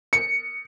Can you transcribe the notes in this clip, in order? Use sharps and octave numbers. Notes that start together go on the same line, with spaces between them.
C#7